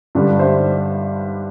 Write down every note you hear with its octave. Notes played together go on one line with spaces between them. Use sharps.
G2 D3 G3 D4
C5 E5